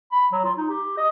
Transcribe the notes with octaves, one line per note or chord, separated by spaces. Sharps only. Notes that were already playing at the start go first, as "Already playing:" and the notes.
B5
F#3
F4
D#4
G4
D#5